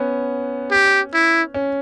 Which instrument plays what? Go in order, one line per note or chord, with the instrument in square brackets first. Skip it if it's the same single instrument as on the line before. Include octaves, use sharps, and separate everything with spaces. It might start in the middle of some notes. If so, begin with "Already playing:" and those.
Already playing: [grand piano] B3 C#4
[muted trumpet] G4
E4
[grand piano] C#4